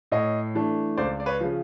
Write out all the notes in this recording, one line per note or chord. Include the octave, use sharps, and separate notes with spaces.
A2 C#5 D#5
E3 A3 D4
C#2 C5 D5
D5
B4 C#5
C#3 F3